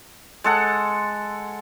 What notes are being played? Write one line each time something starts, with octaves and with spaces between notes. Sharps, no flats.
G#3 A4 F#5